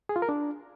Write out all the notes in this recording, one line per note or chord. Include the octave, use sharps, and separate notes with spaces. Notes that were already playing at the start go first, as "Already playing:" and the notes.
G#4
F4
A#4
D4